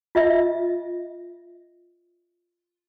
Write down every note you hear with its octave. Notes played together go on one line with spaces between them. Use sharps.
F4 D#5 E5